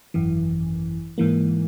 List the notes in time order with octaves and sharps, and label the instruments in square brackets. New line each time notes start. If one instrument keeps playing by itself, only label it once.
[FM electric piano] G#1 F#2 E3
G#2 E3 A#3